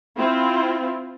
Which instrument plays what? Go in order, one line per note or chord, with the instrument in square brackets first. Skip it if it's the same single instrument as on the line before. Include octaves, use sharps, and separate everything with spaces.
[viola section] C4 E4 F4